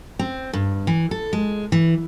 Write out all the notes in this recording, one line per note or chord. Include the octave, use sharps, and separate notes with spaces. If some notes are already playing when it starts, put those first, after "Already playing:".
C4
G2
E3
A4
G#3
E3